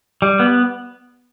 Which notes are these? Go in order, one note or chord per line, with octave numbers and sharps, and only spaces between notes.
G3
B3